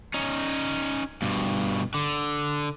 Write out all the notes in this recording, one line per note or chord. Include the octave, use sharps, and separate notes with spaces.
C#4 D#4
G2 B2
D3